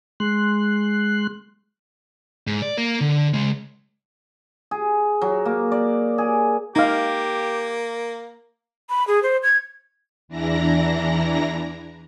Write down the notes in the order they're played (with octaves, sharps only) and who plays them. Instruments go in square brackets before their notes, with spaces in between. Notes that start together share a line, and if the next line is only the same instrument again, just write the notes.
[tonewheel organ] G#3 C6 F#6
[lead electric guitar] G#2
D5
A#3 A#4
D3
C#3 G#3
[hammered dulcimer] G#4
F#3
A#3
D5
G#4
[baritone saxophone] A#3 [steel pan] D#4 F5 [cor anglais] G4
[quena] B5
G#4
C5
G#6
[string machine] E2 E3 D4 E4 A#5 A#6